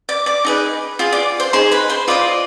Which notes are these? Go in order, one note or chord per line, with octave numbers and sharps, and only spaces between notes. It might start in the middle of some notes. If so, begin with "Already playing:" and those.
D5 D6
D5 D6
D#4 G#4 B4
F4 G#4
D5 D6
C5 C6
D#4 G#4 C5 C6
B4 B5
C5 C6
F4 C5 D5 D#5 D6